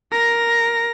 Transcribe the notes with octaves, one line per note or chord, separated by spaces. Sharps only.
A#4 A#6